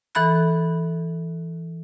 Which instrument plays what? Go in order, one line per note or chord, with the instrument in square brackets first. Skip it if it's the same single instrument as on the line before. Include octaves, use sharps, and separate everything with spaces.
[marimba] E3 A4 B5 F#6